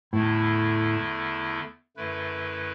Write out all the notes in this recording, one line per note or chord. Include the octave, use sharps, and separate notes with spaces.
E2 A2 D3 A3 E4
F#2 D3 A3 E4 B4